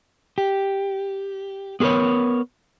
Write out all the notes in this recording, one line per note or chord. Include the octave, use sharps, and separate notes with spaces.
G4
B3 G#4 A#4 B4 C#5